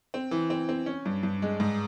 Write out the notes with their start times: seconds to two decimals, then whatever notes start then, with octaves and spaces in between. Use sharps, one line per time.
0.14 C4
0.31 E3
0.50 C4
0.69 C4
0.86 C#4
1.05 G2
1.23 G2
1.42 G#3
1.60 G#2